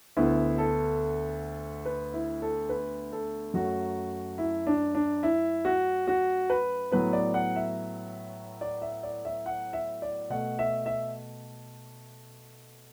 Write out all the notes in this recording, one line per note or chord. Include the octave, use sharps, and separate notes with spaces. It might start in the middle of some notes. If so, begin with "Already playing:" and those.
D2 D3 B3 E4
A4
B4
E4
A4
B4
A4
F#2 F#3 A3 F#4
E4
D4
D4
E4
F#4
F#4
B4
A2 F#3 B3 B4
D5
F#5
E5
D5
E5
D5
E5
F#5
E5
D5
B2 A3 F#5
E5
E5